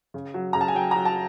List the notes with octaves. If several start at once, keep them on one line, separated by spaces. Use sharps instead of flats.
C#3
F#3
C#3 A#5
A5
G#5
F#3 G5
F#3 A#5
A5